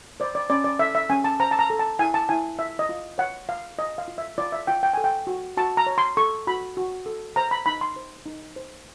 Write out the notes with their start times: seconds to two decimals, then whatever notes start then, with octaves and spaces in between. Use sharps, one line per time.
0.20 C5 D5
0.35 D5
0.50 C#4 D5
0.64 D5
0.79 A4 E5
0.95 E5
1.10 C#4 G#5
1.24 A5
1.40 C5 A#5
1.51 A5
1.59 A#5
1.70 A4
1.79 A5
1.99 E4 G#5
2.14 A5
2.29 E4 G#5
2.59 F4 E5
2.79 D#5
2.89 F4
3.18 C#5 F#5
3.49 F4 F5
3.78 F4 D#5
3.98 F5
4.08 F4
4.18 E5
4.38 F4 D5
4.52 E5
4.67 F4 G5
4.83 G5
4.93 A4 G#5
5.04 G5
5.27 F#4
5.57 F#4 A5
5.77 A#5
5.87 C#5
5.98 C6
6.17 A4 C#6
6.47 F#4 B5
6.77 F#4
7.06 A4
7.36 C5 A#5
7.51 B5
7.66 D#4 B5
7.81 C6
7.96 C5
8.26 D#4
8.56 C5